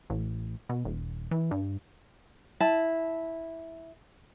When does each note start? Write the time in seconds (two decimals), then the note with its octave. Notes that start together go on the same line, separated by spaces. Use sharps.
0.10 A1
0.69 B2
0.85 D#1
1.31 E3
1.51 G2
2.60 E4 A5